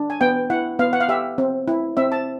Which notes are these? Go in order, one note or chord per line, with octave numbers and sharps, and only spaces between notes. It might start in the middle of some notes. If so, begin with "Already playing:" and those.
Already playing: D4
G#5
B3 G5
E4 F#5
B3 F5
F#5
F5
G4 E5
C4
E4
C4 E5
A5